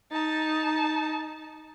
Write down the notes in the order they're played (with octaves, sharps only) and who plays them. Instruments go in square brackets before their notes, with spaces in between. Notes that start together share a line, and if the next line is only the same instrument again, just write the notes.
[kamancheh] D#4 A5